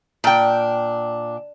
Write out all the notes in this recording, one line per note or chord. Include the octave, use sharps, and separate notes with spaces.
A#2 D4 G5